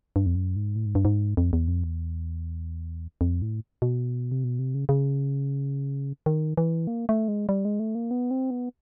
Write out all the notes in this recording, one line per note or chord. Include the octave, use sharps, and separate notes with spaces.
G2
F2
F#2
G#2
A2
G#2
G2
G#2
F2
E2
F2
E2
F2
A2
B2
C3
B2
C3
C#3
C#3
D#3
E3
A#3
A3
G#3
G3
G#3
A3
A#3
B3
C4
B3